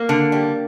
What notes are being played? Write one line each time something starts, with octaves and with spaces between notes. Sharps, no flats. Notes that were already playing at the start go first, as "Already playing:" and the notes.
Already playing: A#3
D3
G3